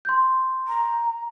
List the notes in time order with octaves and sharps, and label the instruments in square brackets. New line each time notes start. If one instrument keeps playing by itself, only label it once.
[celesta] C6 G6
[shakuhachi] A#5